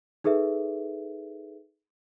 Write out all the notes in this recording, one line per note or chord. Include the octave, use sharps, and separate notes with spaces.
D#4 G#4 A4 B4 E5